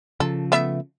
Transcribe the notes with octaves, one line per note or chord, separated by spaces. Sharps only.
C#3 F3 A4
A3 B3 E5